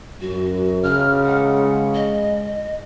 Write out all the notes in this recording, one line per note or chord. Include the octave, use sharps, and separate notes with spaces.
F#2 F#4
C#3 F6
G#3 F#5
D#5